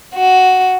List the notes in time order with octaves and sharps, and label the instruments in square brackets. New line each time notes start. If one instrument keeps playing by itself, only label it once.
[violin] F#4